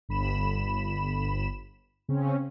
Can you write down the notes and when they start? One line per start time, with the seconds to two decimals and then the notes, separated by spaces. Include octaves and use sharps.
0.09 G1 B5 E7
2.09 C#3 C4 C#4